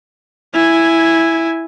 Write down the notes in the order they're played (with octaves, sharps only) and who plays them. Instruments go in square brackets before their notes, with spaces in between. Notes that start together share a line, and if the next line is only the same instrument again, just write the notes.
[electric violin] E4 G#5